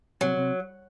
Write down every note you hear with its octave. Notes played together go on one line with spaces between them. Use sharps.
C3 F#3
C3